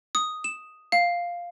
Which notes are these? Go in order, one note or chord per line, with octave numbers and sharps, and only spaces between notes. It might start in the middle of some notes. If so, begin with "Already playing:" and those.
D#6
E7
F5